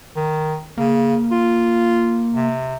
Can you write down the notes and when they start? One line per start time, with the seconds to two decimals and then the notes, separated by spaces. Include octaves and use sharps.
0.16 D#3
0.78 C#3 A#3
1.32 F4
2.34 C3